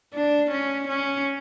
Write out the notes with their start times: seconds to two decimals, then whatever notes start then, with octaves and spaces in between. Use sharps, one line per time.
0.14 D4
0.51 C#4
0.88 C#4